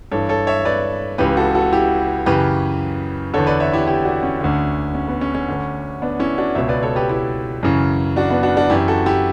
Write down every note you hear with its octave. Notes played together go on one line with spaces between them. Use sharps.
G2 E3 A4 C#5
A4 C#5
C#5 E5
B4 D5
C#2 C#3 E3 G4 B4
F#4 A4
F#4 A4
E4 G4
F#2 C#3 E3 G4 B4
E2 D3 A4 C#5
B4 D5
C#5 E5
E4 G4
E4 G4
D4 F#4
C#4
D2 D3
C#4
B3
C#4
C#4
D2 D3
B3 D4
C#4 E4
D4 F#4
C#2 B2 C#5 E5
B4 D5
A4 C#5
G4 B4
E4 G4
F#2 C#3 E3
D4 F#4
B3 D4
D4 F#4
D4 F#4
F#2 E3 E4 G4
F#4 A4
E4 G4